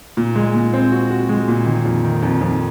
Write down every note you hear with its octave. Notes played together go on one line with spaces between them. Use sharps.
A#2
G#3
A#2
C4
F#4
F#4
G#3
A#2
D#3
F2
D#3
F2
F2